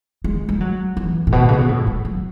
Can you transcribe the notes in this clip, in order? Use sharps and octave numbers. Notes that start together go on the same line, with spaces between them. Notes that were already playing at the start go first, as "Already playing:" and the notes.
G#3
G#3
F#3
E3
A2
B2
C#3
B2
A2
G#3
F#3